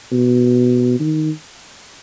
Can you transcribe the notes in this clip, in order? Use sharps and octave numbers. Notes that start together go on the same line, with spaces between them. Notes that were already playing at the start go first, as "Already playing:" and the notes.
B2
D#3